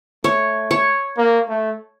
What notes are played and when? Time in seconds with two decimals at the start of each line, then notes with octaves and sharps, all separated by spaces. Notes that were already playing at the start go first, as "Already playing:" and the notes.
0.24 A3 C#5
0.71 C#5
1.18 A#3
1.49 A3